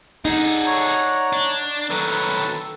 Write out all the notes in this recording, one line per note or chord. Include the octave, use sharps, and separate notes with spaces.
D#4 G#4 A4 D5 F#5
C#5 A#5
D4
D#3 F#3 A4 B4 B5